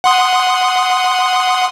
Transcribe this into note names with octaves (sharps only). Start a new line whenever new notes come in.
F#5 C6 D#6